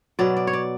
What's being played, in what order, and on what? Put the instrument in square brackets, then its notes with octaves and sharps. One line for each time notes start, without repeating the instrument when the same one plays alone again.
[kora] B2 F#3 D5
D5
C#5
D5